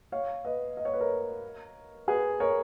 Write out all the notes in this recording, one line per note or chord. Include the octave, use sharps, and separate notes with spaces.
C#5 F5
B4 D#5
D#5
C#5
B4
A#4 C#5
G#4 B4
A#4 C#5